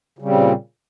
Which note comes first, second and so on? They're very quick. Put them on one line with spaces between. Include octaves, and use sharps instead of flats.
C#3 G3 C4 A#2